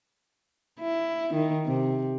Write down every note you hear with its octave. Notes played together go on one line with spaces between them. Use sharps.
E4
D#3
C3